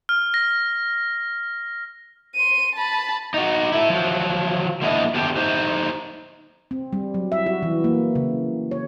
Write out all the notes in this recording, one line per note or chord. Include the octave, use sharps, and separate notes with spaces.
F6
A#6
C6 D#7
A5 B5
D#4 F#4
E4 A4
F3 F#3
F3 A#3 B3 D4 E4 D#5
A3 B3 G4 A4 G5
D#4 G4 C5
C4
G3
F#3
E5
F#4
E3
A#3
C#3
C#5